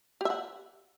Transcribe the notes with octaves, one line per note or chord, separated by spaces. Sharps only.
G4 E5 F#5